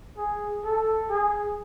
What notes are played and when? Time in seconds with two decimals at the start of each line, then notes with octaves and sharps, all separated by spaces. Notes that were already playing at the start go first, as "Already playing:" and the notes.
0.18 G#4
0.65 A4
1.10 G#4